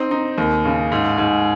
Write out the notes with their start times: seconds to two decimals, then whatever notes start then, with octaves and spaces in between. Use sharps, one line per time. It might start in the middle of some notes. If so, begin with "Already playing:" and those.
Already playing: C4 D#4
0.11 D#4
0.38 D#2
0.65 C#3
0.92 G#2
1.18 G#2